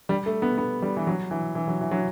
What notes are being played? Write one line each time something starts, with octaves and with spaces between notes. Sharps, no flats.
G3
A3
B3
B3
G3
E3
F#3
E3
E3
F#3
E3
F#3